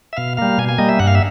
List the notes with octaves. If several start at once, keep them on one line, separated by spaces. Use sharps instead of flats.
E5
B2 F5
G3 A#3 F5
B2 G#5
G#5
G3 A#3 D#5
E5
G2 F#5
F5
E5